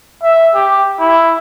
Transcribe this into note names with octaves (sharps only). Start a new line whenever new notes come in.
E5
G4
E4